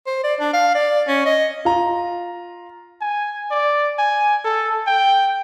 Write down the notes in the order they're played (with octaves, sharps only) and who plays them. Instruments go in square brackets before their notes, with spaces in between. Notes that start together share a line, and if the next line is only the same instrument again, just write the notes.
[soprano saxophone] C5
D5
D4
F5
D5
C#4
D#5
[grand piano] F4 A#5
[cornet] G#5
D5
G#5
A4
G5